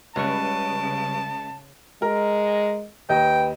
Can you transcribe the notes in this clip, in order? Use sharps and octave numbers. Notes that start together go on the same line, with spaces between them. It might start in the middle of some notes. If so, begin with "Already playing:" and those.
C#2 C#3 G3 B4 A5 C#6
G#3 A#4
D#2 B4 D#5 G5